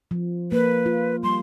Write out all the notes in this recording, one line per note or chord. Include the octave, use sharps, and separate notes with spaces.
F3
A#3 B4
F4
G3 C6